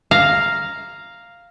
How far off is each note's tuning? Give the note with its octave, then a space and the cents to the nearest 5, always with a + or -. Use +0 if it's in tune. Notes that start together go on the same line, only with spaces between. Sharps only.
F5 +0 A#5 +0